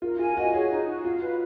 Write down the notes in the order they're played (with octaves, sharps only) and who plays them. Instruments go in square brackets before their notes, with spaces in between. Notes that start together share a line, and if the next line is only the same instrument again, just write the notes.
[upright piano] F4 [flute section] A#4
[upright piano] F4 [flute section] G#5
[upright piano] F#4 [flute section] D#5
[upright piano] G#4 [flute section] C#5
[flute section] D#4
F#4
[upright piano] F4 [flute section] F5
[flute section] B4